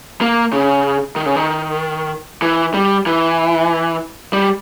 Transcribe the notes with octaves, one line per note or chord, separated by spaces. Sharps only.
A#3
C#3
D#3
C#3
D#3
E3
G3
E3
G3